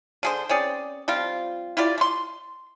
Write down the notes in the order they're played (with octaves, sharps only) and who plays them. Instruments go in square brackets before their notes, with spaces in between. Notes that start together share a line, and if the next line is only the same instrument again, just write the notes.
[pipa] D3 G#4 C5
C4 C#4 G#4 D5
F3 G3 C4 F4
E4 F4 G4 D5
A3 C6